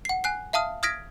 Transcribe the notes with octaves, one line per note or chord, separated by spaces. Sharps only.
F#5 C7
G#5 F#6 C7
E5 F5 A5 D#6 F6
D#6 F6 G#6 A#6 B6 D7